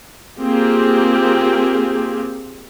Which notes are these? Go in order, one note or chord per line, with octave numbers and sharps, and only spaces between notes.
A#3 C4 F4 G4 G#4